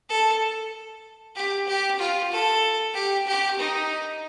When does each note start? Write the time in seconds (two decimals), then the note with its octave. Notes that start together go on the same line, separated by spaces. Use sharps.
0.09 A4
1.36 G4
1.67 G4
1.99 F4
2.31 A4
2.94 G4
3.27 G4
3.59 D#4